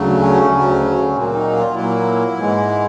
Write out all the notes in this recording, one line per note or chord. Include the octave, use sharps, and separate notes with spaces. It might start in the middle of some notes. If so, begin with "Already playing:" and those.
Already playing: D2 C#3 F#3 A3
C#4
D2 C#3 F#3 A3
A#2 F#3 A#3 C4
D#4
F4
A#2 F#3 A#3 E4
G#2 E3 G#3